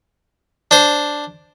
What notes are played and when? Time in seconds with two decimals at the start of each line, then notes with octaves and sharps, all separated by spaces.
0.71 D4 C5